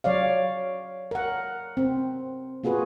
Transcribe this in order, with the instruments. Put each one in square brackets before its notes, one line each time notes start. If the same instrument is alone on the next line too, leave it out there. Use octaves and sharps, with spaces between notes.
[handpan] F#3 C#5 D5 F5
A#4 F#5
C4
A#3 F4 F#4 G#4 B4